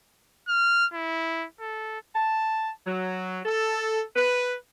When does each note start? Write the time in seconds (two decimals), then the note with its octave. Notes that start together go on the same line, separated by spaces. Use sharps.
0.48 F6
0.93 E4
1.60 A4
2.16 A5
2.87 F#3
3.45 A4
4.16 B4